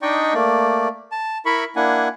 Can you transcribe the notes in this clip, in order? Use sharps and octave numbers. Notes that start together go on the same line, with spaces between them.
D4 D#4 D5 D#5 G5 C#6
A3 A#3 D5
A5
E4 A#4 E5 B5 C#6
A#3 D4 E4 F#5 G#5